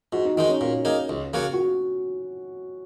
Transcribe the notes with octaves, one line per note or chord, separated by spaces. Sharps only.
G#2 F#4
D#4
D#3 G#3 D#4 F#4
C#4
A#2
A#3 D#4 G#4
C#2
C#3 A#3 F#4 C#5
F#4